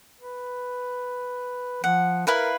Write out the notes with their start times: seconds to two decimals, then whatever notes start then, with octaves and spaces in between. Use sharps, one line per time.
0.20 B4
1.84 F3 F#5
2.27 E4 A#4 B4 F5